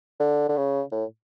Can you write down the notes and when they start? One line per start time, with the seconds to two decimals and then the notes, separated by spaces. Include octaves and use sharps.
0.20 D3
0.49 D3
0.57 C#3
0.92 A2